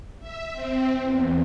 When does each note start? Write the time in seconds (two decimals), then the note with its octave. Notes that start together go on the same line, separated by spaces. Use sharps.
0.20 E5
0.52 C4
0.99 E2